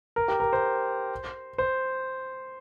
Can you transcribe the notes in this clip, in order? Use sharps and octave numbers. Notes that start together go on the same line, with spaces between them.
A#4
G4
A#4
C5
C5